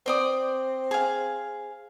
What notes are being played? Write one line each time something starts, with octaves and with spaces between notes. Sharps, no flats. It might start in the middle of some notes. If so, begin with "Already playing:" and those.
C4 C5 D5 D#6
G#4 F5